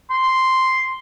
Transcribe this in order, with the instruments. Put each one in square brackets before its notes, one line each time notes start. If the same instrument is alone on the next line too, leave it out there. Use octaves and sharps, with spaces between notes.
[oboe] C6